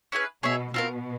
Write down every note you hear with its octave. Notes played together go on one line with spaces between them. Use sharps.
C#4 E4 G#4 B4
B2 G#4 C#5 E5
B2 C4 F4 A#4